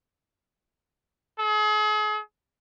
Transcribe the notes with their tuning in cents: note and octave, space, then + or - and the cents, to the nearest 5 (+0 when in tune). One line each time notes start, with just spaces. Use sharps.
G#4 +40